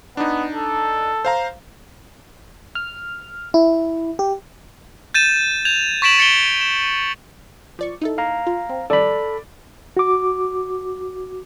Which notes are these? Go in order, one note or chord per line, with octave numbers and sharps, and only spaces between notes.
B3 D4 D#4
A4
C5 F5 A#5
F6
E4
G4
G6 A6 D#7 E7
G6 G#6 F7
C#6 A6 B6 D7 E7 F#7
A6 C#7 D7 G7
E7
F3 D5 C#6
D#4 E4 A4
F5 A#5
F4
C4
D#3 F3 G3 A4 D5 B5
F#4 D6